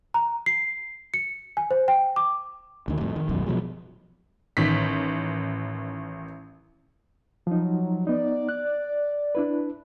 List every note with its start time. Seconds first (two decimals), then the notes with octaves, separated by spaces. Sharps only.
0.14 A#5
0.46 C7
1.14 C#7
1.57 G#5
1.71 C5
1.88 G5
2.16 D6
2.88 D2 D#3
3.01 F2 A2
3.16 D#3
3.29 E1 B1 F#2 D#3
3.46 B2 F3 F#3 G#3
4.57 A1 D#3 B6
7.47 F3 F#3 D#4
8.07 B3 D#4 D5
8.49 F#6
9.35 D4 E4 B4